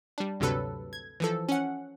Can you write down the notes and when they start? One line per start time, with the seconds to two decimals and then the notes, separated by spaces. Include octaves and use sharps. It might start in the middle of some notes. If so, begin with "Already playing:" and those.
0.18 G3 D4
0.40 D2 G2 C3 F#3 A4 B4
0.93 G#6
1.20 E3 F3 A4
1.49 C#4 F#5